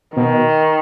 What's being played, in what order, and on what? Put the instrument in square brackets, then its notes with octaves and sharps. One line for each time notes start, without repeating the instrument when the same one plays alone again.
[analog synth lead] B2 [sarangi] D#3